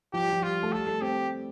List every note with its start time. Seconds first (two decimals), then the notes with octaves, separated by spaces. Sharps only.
0.13 F3 G4
0.22 G3
0.33 F3
0.42 G3 F4
0.63 A3
0.72 G3 A4
0.87 A3
1.01 C4 G4